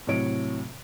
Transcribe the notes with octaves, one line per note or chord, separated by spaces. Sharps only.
A2 C3 F#3 C#5 D7